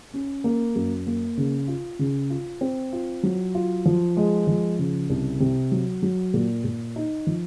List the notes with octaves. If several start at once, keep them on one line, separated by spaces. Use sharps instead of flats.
C#4
A#3
F#2
A#3
C#3
F4
C#3
F4
C4
F4
F#3
F4
F3
G#3
F3
C#3
C2
C3
F#3
F#3
A#2
A#2
D#4
F3